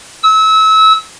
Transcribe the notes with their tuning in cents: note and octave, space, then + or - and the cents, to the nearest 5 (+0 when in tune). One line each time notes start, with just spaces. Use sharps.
E6 -30